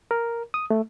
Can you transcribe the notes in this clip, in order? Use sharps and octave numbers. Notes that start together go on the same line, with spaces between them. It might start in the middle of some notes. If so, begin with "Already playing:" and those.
A#4
D#6
A3